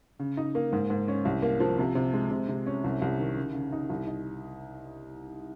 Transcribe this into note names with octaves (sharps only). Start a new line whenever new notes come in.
C#3
D#4
A#3
G#2
G#2
C#4
C2
A#3
F3
C3
C3
G#3
C3
C3
C#4
C2
C2
D#3
C#3
C#3
D#4
C2
D#4